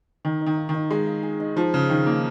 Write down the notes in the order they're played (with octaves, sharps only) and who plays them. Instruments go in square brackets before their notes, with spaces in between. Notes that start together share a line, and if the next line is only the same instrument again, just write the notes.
[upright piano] D#3 [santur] D#4
[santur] D#4
[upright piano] D#3
[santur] F5
[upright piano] D#3
[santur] D#4
[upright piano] G#3 [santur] F5
[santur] F5
G#4
D#4
[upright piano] F3 [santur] D#4
[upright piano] C#3 [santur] G#4
[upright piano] D#3 [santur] D#4
[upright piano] A#3 [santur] D#4